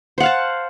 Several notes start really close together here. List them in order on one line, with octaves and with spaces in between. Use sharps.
C5 F#5 F5 A5